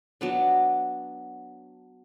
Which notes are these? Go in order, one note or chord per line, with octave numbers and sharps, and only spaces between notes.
F#3 B3 D4